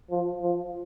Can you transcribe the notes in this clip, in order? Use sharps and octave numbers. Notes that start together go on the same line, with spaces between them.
F3
F3